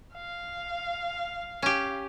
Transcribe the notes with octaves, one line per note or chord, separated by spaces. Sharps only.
F5
C#4 G4